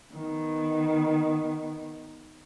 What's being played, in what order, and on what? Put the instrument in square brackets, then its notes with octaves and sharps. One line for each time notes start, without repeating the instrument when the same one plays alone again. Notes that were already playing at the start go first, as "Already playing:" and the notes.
[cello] D#3 B3